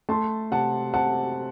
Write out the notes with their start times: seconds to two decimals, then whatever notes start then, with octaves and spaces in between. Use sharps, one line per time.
0.09 A3 A5 C6
0.51 C3 F#5 A5
0.94 C3 F#5 A5